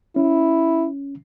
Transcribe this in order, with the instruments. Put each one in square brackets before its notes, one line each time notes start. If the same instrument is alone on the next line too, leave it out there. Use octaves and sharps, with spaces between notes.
[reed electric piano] C#4 [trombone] E4